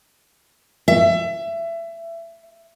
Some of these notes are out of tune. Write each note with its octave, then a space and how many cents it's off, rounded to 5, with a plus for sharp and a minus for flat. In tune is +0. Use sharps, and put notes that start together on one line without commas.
E5 +25